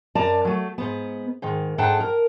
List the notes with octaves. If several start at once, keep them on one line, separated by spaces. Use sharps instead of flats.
F#2 D5 A5 A#5
F#3 A3
G#2 B3
G#2 D#3
G#2 D4 A4 F#5 G5 A5
A#4